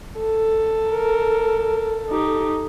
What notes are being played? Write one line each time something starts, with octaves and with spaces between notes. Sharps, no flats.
A4
A#4
D#4 G4